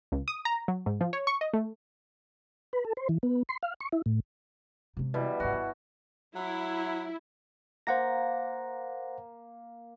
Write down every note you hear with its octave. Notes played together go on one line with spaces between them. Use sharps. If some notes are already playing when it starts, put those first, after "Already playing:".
C#2
D#6
A#5
F#3
G#2
F3
C#5
C#6
D#5
A3
B4
A4
C5
E3
B3
C6
F5
C#6
E4
A2
C3 G#3
B2 E3 G3
G#2 A#3 F#4
G1
F#3 E4
A#3 C5 F#5 A#6